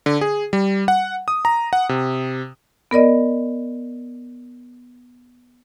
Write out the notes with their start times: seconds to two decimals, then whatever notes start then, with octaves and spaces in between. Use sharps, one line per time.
0.06 D3
0.21 G#4
0.53 G3
0.88 F#5
1.28 D#6
1.45 A#5
1.73 F#5
1.89 C3
2.91 B3 A#4 D5 D#5